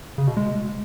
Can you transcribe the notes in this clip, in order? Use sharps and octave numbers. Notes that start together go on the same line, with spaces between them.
C#3
B2
G#3